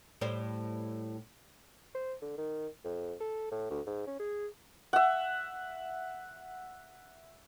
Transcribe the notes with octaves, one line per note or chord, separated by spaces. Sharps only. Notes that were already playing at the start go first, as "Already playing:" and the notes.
A2 G3 C5
C5
D3
D#3
F2
A4
A2
D2
G#2
C#4
G#4
E5 F#5